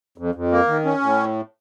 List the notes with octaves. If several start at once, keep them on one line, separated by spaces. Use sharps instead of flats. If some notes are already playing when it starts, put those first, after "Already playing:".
F2
F2
A#3
D#3
C#4
A2